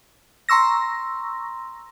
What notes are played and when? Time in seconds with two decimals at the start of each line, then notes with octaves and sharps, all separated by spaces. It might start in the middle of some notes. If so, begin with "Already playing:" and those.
0.49 A#5 C6 C#6 E6 A#6